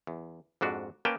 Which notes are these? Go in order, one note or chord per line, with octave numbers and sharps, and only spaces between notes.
E2
F2 G#2 D4 F#4
A#3 C#4 A#4 B4 G5 A5